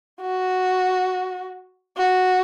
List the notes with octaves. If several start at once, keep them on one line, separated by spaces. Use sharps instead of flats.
F#4
F#4